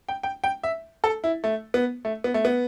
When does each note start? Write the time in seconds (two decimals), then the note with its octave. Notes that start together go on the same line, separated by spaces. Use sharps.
0.09 G5
0.23 G5
0.44 G5
0.63 E5
1.04 A4
1.24 E4
1.44 A3
1.74 B3
2.05 A3
2.24 B3
2.34 A3
2.45 B3